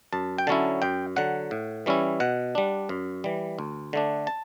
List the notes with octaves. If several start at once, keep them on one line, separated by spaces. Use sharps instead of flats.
F#2 A5
G5
D3 F#3 C#4 E4 A5
F#2 G5
D3 F#3 F#5
A2
E3 G3 C#4 E4
B2 F#5
G3 D4
F#2
E3 G3
D2
D3 A3 D4
A5